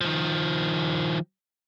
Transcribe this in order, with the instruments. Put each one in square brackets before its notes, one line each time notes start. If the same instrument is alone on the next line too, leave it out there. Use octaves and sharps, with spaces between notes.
[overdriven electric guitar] D#3 F3